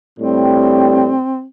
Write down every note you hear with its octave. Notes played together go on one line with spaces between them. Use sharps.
A2 G3 C4 D4 G4